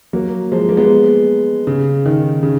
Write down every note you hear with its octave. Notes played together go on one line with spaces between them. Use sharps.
F#3 A#3
F3 G#3
A#3
G#3 B3
C#3
D#3
C#3